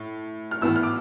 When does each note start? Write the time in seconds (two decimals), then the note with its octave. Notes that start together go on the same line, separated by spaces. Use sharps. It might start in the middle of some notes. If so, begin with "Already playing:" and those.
Already playing: A2
0.51 F6
0.61 A2 E3 B3 E4 E6
0.76 F6
0.83 D6